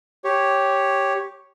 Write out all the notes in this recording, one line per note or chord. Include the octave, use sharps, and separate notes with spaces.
G4 C#5